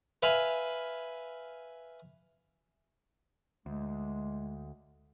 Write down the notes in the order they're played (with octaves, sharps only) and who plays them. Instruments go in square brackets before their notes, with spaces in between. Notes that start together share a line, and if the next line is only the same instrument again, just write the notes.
[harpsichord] B4 E5 F5 G#5 B5
[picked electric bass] D2 [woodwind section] G#3